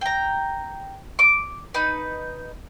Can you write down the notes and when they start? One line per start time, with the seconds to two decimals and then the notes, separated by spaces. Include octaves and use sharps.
0.01 G5 A#5
1.19 D6
1.74 D#4 B4